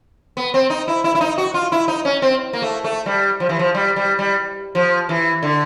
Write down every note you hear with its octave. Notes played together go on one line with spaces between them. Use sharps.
B3
C4
D#4
E4
E4
E4
D#4
F#4
F4
E4
D#4
C#4
C4
A#3
A3
A3
G3
F3
E3
F3
G3
G3
G3
F3
E3
D3